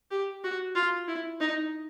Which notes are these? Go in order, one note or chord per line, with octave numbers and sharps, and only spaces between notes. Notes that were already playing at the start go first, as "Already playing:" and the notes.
G4
F#4
F4
E4
D#4